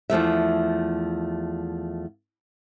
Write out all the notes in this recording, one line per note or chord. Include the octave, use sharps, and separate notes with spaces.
E2 F3 A3 E5